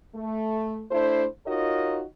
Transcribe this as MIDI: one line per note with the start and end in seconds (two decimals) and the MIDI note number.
0.15 0.82 57
0.90 1.26 57
0.90 1.26 62
0.90 1.26 64
0.90 1.26 72
1.46 2.02 63
1.46 2.02 65
1.46 2.02 66
1.46 2.02 70
1.46 2.02 73
1.46 2.02 75